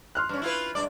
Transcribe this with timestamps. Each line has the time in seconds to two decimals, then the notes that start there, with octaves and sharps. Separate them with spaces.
0.15 C6 F6 F#6
0.29 G2 C#4
0.42 E4 F4 B4
0.75 G2 G#3 D5